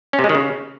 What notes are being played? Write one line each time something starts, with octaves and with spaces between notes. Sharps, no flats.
C#4
C3
G#3
D#3
C#3